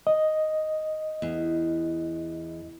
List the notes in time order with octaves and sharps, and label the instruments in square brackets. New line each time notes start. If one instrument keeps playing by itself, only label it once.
[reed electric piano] D#5
[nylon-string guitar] E2